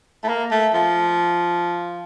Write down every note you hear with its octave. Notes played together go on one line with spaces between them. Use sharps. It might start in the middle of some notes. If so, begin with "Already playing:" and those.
A3
A#3
A3
F3